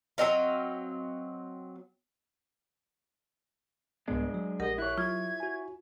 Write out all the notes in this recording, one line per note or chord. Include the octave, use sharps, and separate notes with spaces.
F#3 C4 D#5 F5
C2 G#2 G#3 B3 D4
F#3
A#1 G4 A#4 D#5 F#5
E4 C#5 F#6
F#3 F4 G#6
F#4 G#5